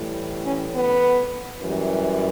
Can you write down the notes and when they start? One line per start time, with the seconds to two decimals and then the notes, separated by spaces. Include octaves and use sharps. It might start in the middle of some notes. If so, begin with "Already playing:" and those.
Already playing: A2 E3 G3
0.43 C#4
0.73 B3
1.63 F#2 E3 G3